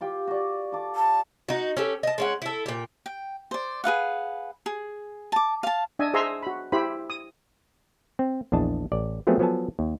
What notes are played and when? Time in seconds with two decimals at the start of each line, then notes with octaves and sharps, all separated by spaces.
0.01 F4 G4 G5
0.27 F#4 D5
0.72 F4 A4 D6
0.95 A5
1.49 D#4 F#4
1.77 C#4 G4 A4
2.03 D#5 A5
2.18 G#3 C#4 F#5
2.42 E4 A4
2.66 A#2 G4
3.06 G5
3.51 C5 D5
3.84 G#4 B4 F5 F#5
4.66 G#4
5.32 A5 D6
5.63 F5 A5
5.99 D4 D#5 E5 G#5
6.14 G#4 C5 D#5 E5 A#5 C6
6.43 F#4 B5
6.72 E4 G4 C5 B5
7.10 D#6
8.19 C4
8.52 A#1 E2 D4 D#5 A5
8.92 A1 D5
9.27 F3 F#3 A3 B3 C4 G#4
9.39 F3 F#3 B3 A4 G#5 A5
9.79 D#2